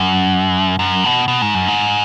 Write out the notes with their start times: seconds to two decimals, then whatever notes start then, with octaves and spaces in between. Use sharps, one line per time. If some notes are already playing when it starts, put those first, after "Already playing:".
Already playing: F#2
0.79 F#2
1.04 B2
1.28 B2
1.42 G#2
1.55 F#2
1.68 G#2